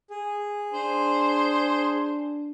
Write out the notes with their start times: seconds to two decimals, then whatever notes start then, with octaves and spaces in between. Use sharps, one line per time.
0.10 G#4
0.73 D4 C5